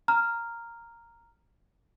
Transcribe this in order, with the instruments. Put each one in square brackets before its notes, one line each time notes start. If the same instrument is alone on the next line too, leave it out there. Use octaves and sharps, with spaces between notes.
[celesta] A#5 F6